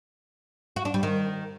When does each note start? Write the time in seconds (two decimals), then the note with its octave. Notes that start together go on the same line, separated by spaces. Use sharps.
0.76 F#4
0.85 D4
0.94 G3
1.03 D#3